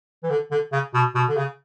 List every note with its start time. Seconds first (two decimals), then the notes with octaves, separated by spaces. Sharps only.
0.24 E3
0.30 D3
0.51 D3
0.72 C#3
0.94 B2
1.15 B2
1.29 D3
1.37 C#3